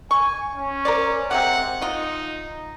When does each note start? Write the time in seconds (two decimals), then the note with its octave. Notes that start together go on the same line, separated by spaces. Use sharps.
0.11 G#5 C#6
0.55 C#4
0.85 A#4 C5 D5
1.31 C3 G#3 C4 F#5
1.82 D#4 F4 D#5